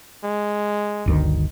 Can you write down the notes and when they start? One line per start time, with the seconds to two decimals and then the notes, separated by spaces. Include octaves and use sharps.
0.24 G#3
1.06 G1 D2 D#3